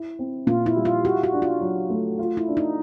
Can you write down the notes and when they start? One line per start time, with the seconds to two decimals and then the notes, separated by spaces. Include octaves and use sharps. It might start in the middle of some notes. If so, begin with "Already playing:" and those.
Already playing: E4
0.19 C4
0.47 A#2 F4
0.66 E4
0.76 G3
0.85 F4
1.05 F#4 G4
1.24 F#4
1.33 D4
1.42 F4
1.61 F#3
1.90 A3
2.19 F4
2.37 E4
2.48 D4
2.57 D#4